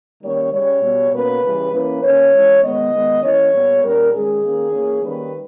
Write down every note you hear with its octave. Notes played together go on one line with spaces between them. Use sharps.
D#3 G3 A#3 C#4 C#5
C#3 G3 C#4 C#5
B2 G3 B3
B2 A#3 C#4 B4
C#3 E3 G3
E3 A#3 C#4 B4
D#3 A#3 C#4 C#5
E3 G#3 C#4
D#3 G#3 B3 D#5
D#3 G#3 B3
E3 A#3 C#4 C#5
A#2 G3 B3
A#2 G3 C#4 A#4
D#3 G#3 C#4 G#4
D#3 A#3 C#4
E3 A#3 C#4
D#3 G3 A#3 C#4 B4